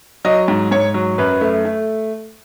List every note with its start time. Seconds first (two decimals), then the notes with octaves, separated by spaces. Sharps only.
0.25 F#3 D#5
0.48 G#2
0.71 G#2 C#5
0.94 F#3
1.18 F#2 B4
1.41 A3
1.65 A3